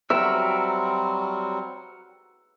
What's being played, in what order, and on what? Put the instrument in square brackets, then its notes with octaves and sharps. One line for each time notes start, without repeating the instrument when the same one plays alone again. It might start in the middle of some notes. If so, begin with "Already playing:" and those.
[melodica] F#3 G3 C4 [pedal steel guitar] F#4 A#4 E5 [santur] E6